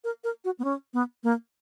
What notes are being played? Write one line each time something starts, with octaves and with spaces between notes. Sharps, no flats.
A#4
A#4
F#4
B3
C#4
B3
A#3